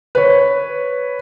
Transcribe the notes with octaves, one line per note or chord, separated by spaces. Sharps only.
B4 C#5